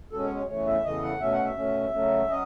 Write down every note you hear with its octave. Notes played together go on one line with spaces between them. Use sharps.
B2 G#3 C#4 A4
C#5
C#5
E2 C#3 E3 A3 C#5
E5
E2 C#3 E3 A3 D#5
F#5
B2 A3 C#4 E5
F#5
E5
B2 A3 C#4
C#3 F#3 A3 C#4
F#3 C#4 D#5